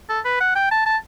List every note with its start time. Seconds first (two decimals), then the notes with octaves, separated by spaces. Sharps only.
0.09 A4
0.25 B4
0.40 F#5
0.56 G5
0.71 A5
0.86 A5